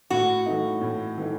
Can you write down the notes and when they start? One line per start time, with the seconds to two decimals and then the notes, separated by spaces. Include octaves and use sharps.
0.10 A2 F#4
0.46 E3 A3 D#4
0.81 A2
1.18 E3 A3 D#4